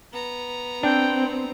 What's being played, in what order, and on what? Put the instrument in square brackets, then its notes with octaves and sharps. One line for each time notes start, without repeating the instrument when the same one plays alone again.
[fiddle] B3 A#5
[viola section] C4 [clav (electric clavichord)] D4 [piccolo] G5